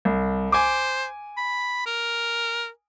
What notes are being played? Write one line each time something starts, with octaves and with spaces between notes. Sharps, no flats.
C2
C5 G#5 D6
B5
A#4